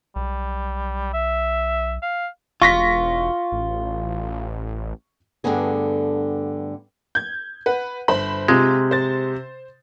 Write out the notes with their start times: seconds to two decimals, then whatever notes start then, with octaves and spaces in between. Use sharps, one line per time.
0.16 B1 G3
1.14 E5
2.02 F5
2.62 E1 F4 C#6 A#6 B6
3.52 A1
5.44 G2 D3 A3 B3 G#4
7.15 G6 G#6
7.66 B4 F#5
8.08 G1 C5 B5
8.48 C3 G#3 F4 G4
8.91 C5 A6